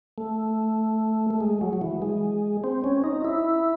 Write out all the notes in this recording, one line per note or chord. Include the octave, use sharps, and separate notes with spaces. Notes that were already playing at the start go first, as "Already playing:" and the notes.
A3
A3
G#3
F#3
F#3
E3
G#3
C4
C#4
D#4
E4